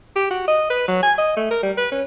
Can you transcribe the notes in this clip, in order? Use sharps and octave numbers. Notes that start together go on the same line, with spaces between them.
G4
F#4
D#5
B4
F#3
G#5
D#5
A3
A#4
G3
B4
C#4